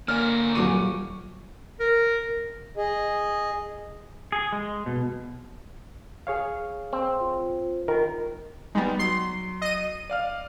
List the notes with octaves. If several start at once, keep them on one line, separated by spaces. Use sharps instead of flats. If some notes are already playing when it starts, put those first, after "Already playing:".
D3 A#3 C#5 D5 G#5 F6
D#1 F#3 F5 C#6 D6 D#7
A#4
G#4 D#5
G#4
G#3
B2
G#4 C#5 F5
C4
F4
D#3 A#4
G3 G#3 B3 D#4
F#3 C6 C7
D#5 D#7
D5 F5 F6